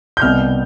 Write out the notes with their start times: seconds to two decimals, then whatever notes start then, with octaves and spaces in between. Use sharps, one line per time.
0.17 G6
0.21 C2 B2 G3 B3 F6